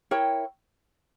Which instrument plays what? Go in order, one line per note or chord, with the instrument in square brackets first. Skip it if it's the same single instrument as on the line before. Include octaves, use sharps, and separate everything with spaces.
[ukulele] E4 A#4 C#5 G5